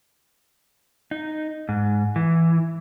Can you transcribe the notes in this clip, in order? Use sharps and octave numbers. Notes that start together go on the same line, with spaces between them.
D#4
G#2
E3